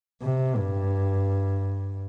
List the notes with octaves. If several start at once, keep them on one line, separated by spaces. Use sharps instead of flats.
C3
G2